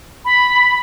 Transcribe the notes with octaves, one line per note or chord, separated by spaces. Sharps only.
B5